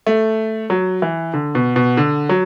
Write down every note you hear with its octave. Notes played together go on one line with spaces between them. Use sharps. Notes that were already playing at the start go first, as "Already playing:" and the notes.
A3
F#3
E3
D3
B2
B2
D3
F#3